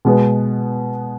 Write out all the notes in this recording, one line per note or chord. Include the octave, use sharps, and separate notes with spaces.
B2 G#3 B3